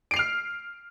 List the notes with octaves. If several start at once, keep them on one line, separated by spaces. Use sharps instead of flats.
F6 C7 D7 F7